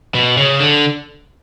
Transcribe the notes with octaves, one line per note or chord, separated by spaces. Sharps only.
B2
C#3
D3